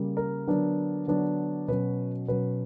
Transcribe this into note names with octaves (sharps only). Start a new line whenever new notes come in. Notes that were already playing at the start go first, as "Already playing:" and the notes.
Already playing: C#3 G3 A#3
A#4
D3 F#3 B3 D4
D3 F#3 B3 D4
B2 F#3 C#4 B4
B2 F#3 C#4 B4